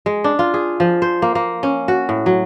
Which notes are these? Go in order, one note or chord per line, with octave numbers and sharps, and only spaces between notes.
G#3
D4
F4
G#4
F3
C5
A#3
A#3
C#4
F#4
A2
F#3